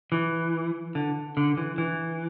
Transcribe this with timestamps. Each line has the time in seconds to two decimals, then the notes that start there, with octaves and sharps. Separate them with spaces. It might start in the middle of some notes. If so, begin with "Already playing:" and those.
0.12 E3
0.95 D3
1.37 D3
1.57 E3
1.78 E3